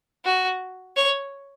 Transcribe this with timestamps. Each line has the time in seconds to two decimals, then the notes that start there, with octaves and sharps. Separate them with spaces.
0.25 F#4
0.96 C#5